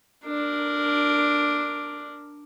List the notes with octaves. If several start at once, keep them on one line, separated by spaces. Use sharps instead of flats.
D4 A#4